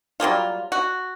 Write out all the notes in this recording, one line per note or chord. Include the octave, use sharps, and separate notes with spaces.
F#3 G3 A#3 F4
F#4